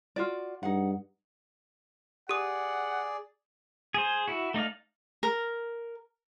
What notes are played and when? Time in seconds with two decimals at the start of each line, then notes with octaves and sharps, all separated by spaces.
0.16 F4 F#4 D5
0.63 G2 D#4 G#4 F#5
2.29 G4 G#4 D5 F#5 D#6
3.94 G#4 C5
4.28 E4 F#4
4.54 A3 D#4 D5 F5
5.23 A#4